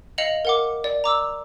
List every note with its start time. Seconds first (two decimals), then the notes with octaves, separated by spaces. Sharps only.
0.18 D#5 F5 C#7 F7 F#7
0.45 A#4 F#5 D6
0.84 D5
1.04 A#5 D6 E6